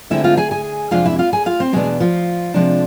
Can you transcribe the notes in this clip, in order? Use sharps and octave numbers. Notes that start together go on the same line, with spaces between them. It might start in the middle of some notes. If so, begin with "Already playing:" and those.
D2 D3 G#3 C4 E4 E5
F4 F5
G#4 G#5
G#4 G#5
F2 C3 G#3 D4 F4 F5
E4 E5
F4 F5
G#4 G#5
F4 F5
C4 C5
E2 B2 G#3 B3 D4 G#4
F3 F4
C3 F3 G#3 D4